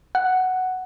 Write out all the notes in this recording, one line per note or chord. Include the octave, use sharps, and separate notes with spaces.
F#5